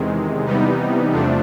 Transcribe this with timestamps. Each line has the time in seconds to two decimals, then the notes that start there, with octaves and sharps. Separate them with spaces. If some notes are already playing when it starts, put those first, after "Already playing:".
Already playing: E2 C3 D#3 G#3
0.45 C3 E3 G3 B3 D#4
1.12 E2 C3 F3 A3 D4